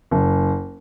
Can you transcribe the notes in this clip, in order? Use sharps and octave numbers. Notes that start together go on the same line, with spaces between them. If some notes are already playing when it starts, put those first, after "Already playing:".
F#1